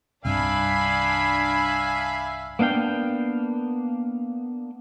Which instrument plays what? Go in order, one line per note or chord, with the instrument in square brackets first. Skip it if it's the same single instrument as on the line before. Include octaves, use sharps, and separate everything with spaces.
[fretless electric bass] C2 G2 C3 [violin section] D4 B5 [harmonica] E5 F5 G#5
[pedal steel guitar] A#3 B3 D4 F5 G5